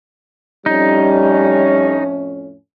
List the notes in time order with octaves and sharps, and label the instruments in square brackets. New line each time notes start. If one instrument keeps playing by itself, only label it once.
[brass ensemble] F2 A2 C#4 [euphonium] G3 [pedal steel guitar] D#4